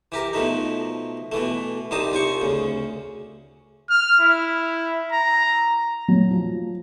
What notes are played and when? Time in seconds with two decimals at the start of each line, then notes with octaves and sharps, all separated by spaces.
0.12 E3 G4 A#4
0.33 B2 F3 A3 D#4
1.32 B2 E3 A3
1.91 C2 G3 D#4 C5 A5 D#6
2.12 C2 F4 C5 C#6
2.41 D2 C#3
3.90 F6
4.20 E4
5.12 A#5
6.08 F#3
6.31 F3